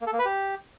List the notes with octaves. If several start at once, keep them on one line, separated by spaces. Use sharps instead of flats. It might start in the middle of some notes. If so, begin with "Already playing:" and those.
A#3
A4
A#3
B4
G4